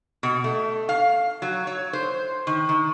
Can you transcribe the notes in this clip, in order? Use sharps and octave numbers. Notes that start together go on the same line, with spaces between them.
B2
A3
F5
F#3
C#5
C5
D#3
D#3